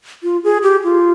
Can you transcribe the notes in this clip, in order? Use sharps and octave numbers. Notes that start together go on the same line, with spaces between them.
F4
G#4
G4
F4